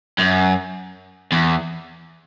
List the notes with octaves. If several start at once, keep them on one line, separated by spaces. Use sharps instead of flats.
F#2
E2